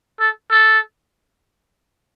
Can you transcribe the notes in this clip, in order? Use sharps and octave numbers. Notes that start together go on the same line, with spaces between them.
A4
A4